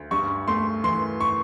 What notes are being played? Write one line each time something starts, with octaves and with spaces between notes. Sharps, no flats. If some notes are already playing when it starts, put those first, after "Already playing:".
Already playing: D2
G2 C#6
A3 C6
E3 C6
C#6